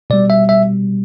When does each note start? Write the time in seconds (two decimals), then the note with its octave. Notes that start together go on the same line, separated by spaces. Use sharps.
0.10 B2 G3 D5
0.30 E5
0.49 E5